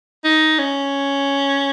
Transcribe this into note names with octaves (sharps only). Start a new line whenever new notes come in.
D#4
C#4